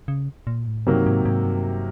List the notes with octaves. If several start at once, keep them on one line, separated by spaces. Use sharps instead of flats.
C#3
A#2
A2
G2 C3 D#3 F#3 A#3
G#2
G#2
G2